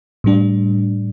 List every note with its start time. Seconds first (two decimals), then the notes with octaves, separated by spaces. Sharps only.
0.24 A2 G3 D4